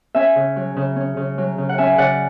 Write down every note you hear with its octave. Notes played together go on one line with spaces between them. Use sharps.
C#4 E5 G#5
C#3
F#3
C#3
C#4
C#3
F#3
C#3
F#5
C#4 E5 G#5
C#3 D5 F#5